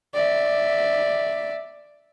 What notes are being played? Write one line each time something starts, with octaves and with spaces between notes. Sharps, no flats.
D5 E5